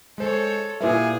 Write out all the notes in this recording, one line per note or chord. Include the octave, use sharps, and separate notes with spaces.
G#3 A4 C5 C#5
A#2 G3 E4 G#4 B4 E5